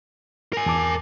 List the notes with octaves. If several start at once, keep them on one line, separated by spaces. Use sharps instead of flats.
A#4 G#5
E2 A5 D6